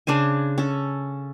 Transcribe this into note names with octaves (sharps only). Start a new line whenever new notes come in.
C#3 D4 C5 G#5
C#4 A4